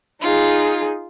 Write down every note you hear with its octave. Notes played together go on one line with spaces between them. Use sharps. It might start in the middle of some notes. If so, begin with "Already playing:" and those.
D#4 F4 G#4